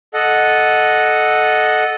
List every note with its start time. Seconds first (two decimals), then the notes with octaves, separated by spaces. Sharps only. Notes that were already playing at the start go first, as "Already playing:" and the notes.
0.14 A4 D#5 F#5